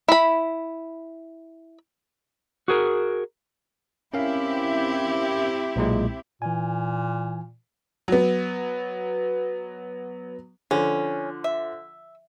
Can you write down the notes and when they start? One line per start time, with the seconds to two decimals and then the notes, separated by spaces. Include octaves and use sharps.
0.08 E4 B5
2.68 F#4 G#4 A#4
4.14 C4 C#4 E4 G4 A#4 F5
5.76 B1 A#2 G#3
6.42 A#2 E3 G#5
8.08 F#3 B3
10.71 D3 F3 C#4
11.44 E5